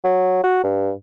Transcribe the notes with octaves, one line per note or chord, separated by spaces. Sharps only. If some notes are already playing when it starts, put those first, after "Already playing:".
F#3
F#4
G2